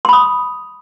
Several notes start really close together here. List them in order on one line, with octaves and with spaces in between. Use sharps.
C6 B5 D#6